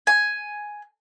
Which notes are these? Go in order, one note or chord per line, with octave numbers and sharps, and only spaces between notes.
G#5